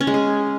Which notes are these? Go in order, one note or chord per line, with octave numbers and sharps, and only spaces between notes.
C#4
G#3
G#4